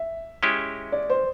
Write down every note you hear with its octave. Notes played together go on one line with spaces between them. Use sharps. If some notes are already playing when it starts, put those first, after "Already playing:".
Already playing: E5
G#3 C#4 E4 G4
D5
C5